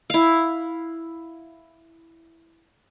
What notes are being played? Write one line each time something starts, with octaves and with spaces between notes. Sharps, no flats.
E4 F5